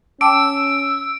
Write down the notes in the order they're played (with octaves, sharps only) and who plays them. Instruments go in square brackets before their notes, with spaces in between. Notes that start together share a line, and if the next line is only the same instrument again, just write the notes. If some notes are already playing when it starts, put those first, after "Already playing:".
[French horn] C#4 [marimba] G5 A5 D6 [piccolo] E6 [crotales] D7